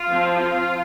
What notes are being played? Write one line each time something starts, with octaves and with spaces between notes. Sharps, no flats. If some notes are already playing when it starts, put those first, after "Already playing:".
Already playing: F4
F3 C4
F4